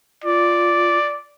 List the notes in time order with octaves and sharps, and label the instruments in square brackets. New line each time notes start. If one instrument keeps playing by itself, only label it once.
[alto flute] F4 [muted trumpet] D5